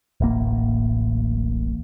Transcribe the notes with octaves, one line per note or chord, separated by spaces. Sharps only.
D1 A1 A#3